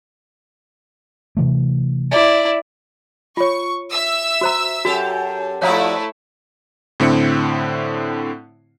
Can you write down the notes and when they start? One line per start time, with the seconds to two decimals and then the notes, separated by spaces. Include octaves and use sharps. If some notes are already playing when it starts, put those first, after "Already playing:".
1.37 C3 E3 A3
2.11 E4 D5
3.37 F4 C#5 C#6
3.91 E5 E6
4.41 F#4 C5 A#5
4.85 F#2 F#4 G4 A4
5.62 F3 A3 E4 F#4 C#5 D5 F5 A#5
7.00 A2 D3 C4 E4 C#7